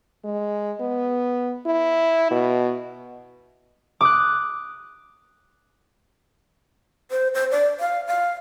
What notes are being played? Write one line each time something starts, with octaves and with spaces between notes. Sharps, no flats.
G#3
B3
E4
B2
D6 D#6 F#6
C5
C5
D5
F5
F5